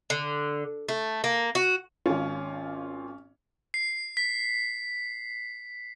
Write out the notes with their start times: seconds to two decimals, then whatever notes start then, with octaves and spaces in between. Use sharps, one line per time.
0.10 D3
0.88 A3
1.24 A#3
1.55 F#4
2.06 G#1 C#4 F4
3.74 C7
4.17 B6